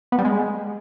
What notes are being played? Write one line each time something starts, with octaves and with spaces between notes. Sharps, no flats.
B3
G3
G#3